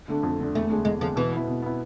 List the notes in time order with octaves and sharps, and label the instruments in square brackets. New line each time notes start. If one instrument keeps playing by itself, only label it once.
[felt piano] D3 A3 D4
F2
D3 A3 D4
[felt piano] E2 [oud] A3
[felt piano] D3 G#3 D4
[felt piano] E2 [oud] G#3
[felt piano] D3 G#3 D4 [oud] F3
[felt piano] B2 [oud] E3
[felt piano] B3 E4
B2
B3 E4